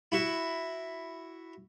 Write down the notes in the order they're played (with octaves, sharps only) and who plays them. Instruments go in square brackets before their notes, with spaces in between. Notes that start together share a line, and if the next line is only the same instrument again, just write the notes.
[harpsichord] E4 F#4 E5